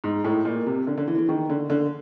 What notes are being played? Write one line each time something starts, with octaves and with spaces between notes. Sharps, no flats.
G#2
A2
A#2
C3
D3
D3
E3
E3
D#3
D3
D3